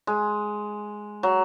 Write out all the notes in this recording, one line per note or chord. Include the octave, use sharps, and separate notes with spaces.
G#3
F#3